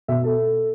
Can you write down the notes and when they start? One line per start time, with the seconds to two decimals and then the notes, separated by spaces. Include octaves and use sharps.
0.08 B2 E5
0.24 A4